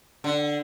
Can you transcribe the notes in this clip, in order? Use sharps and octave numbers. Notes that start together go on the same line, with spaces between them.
D3